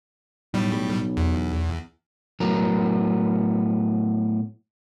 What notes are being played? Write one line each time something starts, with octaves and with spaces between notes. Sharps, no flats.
B1 A2 G3
E2
A2 F#3 B3 A#4